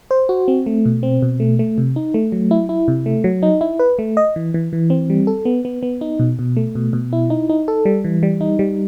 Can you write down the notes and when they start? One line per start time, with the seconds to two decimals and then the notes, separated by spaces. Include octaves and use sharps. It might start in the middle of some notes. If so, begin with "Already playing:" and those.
0.11 C5
0.29 F#4
0.48 C4
0.66 A3
0.86 B2
1.03 C4
1.22 B2
1.40 A3
1.59 A3
1.78 C3
1.96 D#4
2.14 A3
2.32 F#3
2.51 E4
2.69 E4
2.88 C3
3.06 A3
3.24 F#3
3.43 D#4
3.61 E4
3.79 B4
3.99 A3
4.17 D#5
4.36 E3
4.54 E3
4.73 E3
4.90 C4
5.10 G3
5.27 A4
5.45 B3
5.65 B3
5.83 B3
6.01 D#4
6.19 B2
6.39 B2
6.57 A3
6.75 B2
6.93 B2
7.13 E4
7.30 D#4
7.49 D#4
7.68 A4
7.85 G3
8.04 E3
8.23 G3
8.41 D#4
8.59 G3